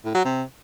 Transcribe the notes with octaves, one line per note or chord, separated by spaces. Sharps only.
A2
F#3
C3